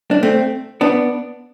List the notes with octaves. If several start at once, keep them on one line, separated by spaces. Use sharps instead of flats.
D4
A3 C4
B3 D4